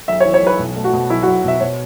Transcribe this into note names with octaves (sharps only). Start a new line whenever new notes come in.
B1 E5
C#5
E3
C#5
B1 B4
B2
A3
F#4
B2
B1 E4
F#3 F#4
B2 E5
B2 C#5